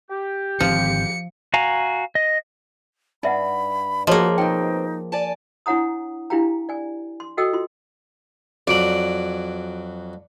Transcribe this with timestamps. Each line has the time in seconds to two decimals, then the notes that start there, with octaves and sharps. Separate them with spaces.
0.10 G4
0.60 G#1 D3 F3 C4 C#7
1.54 F#4 F5 G#5 A#5
2.15 D#5
3.23 G2 D#4 E5 F#5 B5
4.07 F3 A#3 F#4 G#4 C#5 D#5
4.38 B2 C4 D#4 G5
5.12 D5 G#5 A5
5.66 D4 E4 C#5 F#5 A#5 D#6
6.30 D4 E4 G4 F5 G5 A#5
6.69 D5 G#5
7.20 C6
7.37 F#4 A4 D#5 G5 E6
7.53 F4 C6
8.67 F2 F#3 F#4 D5 D7 F#7